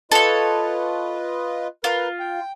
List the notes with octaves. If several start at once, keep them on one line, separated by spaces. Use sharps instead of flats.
F4 A4 B4 C#5 D#5
F4 A#4 B4
G5